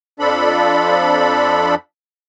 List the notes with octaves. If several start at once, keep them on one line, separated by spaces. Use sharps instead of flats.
F2 F3 D4 A4 B5